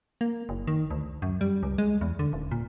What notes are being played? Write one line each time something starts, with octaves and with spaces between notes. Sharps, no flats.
A#3
F#1
D#3
D2
F#2
G3
C#2
G#3
E2
D3
D#1
A#2